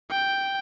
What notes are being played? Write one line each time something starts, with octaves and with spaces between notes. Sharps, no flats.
G5